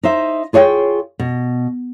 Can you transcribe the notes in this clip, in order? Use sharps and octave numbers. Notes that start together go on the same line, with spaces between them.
D#4 C5 E5
F4 G#4 C#5 F5 G5
B2